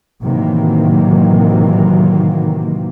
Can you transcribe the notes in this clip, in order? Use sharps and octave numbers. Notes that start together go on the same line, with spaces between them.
A2 C3 D#3 E3 F#3 A#3